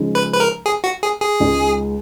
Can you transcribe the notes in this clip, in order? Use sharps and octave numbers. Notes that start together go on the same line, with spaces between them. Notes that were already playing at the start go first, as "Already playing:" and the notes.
Already playing: C#3 F3 G#3 D#4
B4
B4
A#4
G#4
F#4
G#4
G#4
C#2 C#3 G#3 D#4